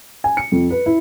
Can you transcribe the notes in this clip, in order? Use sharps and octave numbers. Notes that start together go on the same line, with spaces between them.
G#5
C#7
F2
B4
E4